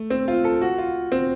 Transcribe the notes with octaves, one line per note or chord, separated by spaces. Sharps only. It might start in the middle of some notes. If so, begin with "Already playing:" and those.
Already playing: A3
C4
F4
A4
F#4
F4
C4